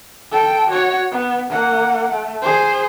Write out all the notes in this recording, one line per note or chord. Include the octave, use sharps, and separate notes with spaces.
A4 G5
F#4 C#5
B3
A#3 F#5
A3
G#4 C5